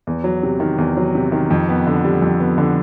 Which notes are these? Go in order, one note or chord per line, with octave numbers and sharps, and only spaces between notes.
E2
F#3
C3
D#3
E2
F#3
C3
D#3
F2
B3
D3
G3
F2
B3
D3